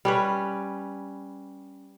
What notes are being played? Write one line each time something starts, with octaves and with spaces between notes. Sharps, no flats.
G3 C#4 B4